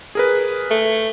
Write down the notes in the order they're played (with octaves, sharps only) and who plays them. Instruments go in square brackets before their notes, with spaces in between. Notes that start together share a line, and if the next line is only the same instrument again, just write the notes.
[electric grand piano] G#4 A#4 B4
[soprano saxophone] A3